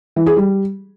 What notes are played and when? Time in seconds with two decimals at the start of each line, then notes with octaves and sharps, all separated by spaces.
0.16 E3
0.26 G#4
0.36 G3